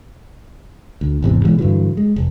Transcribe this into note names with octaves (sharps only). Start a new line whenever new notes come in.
D2
G#1 E2 C3
B2 E3 G#3
G2 D3 E3 F#3
G#3
F1